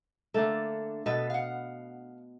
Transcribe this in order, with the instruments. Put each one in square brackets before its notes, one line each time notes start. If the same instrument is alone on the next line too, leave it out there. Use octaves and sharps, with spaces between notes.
[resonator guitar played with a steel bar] D3 A4 [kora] A3 A#3 D4
[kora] B2 B3 [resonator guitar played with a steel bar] A4 B4
[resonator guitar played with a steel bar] F5 F#5